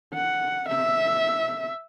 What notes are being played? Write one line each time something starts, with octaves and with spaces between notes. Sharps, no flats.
F#5
E5